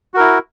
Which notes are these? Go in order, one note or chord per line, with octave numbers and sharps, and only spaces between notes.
E4 F#4 A#4